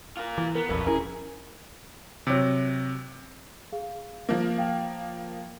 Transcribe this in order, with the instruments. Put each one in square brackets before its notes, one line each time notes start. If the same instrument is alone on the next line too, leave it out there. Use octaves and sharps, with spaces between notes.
[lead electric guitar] F4 A#4
[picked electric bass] E3
[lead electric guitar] B3 [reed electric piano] A#4
[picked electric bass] D#1 B1 F2 [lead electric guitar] A2 B4 [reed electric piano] A#4
[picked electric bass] D#1 C#4 [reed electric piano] E4 A#4 [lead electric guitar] G#4
[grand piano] C3 F#3
[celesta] G#4 F5
[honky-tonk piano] F3 A#3
[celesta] F5 G5